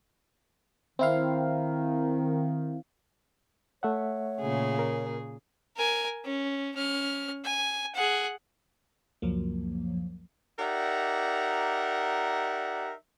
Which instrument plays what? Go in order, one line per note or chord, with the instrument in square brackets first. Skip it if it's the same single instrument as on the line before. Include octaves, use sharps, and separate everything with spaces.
[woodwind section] D#3 [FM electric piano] C4 E4 F5
[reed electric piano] A3 E5 F#5 [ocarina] C#5
[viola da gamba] A#2 C#3 G#4
[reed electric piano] A#4
[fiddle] A#4 G#5
C#4
C#4 F6
G#5
G#4 F#5
[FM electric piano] C#2 F#2 F3 F#3 A#3
[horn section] D#4 G4 A#4 D5 E5 F#5